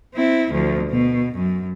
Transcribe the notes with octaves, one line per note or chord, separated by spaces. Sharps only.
C4 E4
D2 F3
B2
F#2